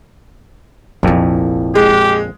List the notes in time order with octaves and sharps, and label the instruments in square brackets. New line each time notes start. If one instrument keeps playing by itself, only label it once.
[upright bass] F1 E4 [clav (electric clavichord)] A#1 F2
[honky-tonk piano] G#3 [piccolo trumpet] G4